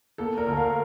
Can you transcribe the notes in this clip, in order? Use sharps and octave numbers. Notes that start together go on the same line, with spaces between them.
A#3 A4
A#4
D2
F5